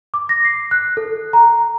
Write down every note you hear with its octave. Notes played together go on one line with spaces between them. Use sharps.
D6
A#6
C7
F#6
A4
A#5